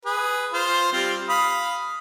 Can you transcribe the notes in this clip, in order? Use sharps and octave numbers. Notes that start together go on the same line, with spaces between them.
G#4 B4
F4 C5
G3 C4 F4
F5 B5 D#6